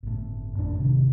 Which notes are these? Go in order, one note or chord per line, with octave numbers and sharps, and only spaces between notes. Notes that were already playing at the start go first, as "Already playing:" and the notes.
G1 A2
G#1 F2 C4 D4
E1 A2 C3 D#3